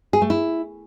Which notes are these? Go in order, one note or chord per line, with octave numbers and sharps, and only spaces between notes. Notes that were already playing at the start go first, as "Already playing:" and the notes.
G#4
A3
E4